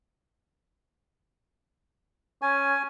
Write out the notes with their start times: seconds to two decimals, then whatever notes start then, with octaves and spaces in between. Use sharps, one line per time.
2.42 C#4 G#5